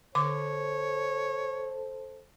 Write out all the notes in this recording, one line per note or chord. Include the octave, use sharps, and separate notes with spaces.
D3 A4 C5 C#5 D6